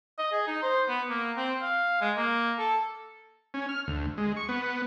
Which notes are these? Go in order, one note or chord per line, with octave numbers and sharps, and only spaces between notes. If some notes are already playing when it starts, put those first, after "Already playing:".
D#5
G#4
D#4
C5
B3
A#3
C4
F5
G#3
A#3
A4
C#4
F6
D2
G#3
C#6
B3